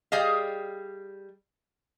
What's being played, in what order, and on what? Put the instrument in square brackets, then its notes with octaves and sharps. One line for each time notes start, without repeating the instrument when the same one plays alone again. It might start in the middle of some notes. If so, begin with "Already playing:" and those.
[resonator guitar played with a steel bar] G3 G#4 D#5 F5